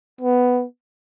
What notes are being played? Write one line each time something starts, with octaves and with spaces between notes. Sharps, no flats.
B3